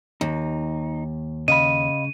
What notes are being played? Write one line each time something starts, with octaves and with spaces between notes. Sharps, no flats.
D#2 D#4
C#3 D#5 F5 B5 D#7